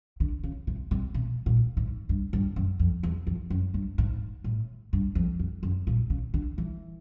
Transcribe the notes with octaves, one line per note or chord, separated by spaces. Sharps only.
D3
C#3
C3
C3
B2
A#2
G#2
G2
G2
F#2
F2
E2
F2
F#2
G2
G#2
A2
G2
F2
F2
F#2
A#2
C#3
D3
E3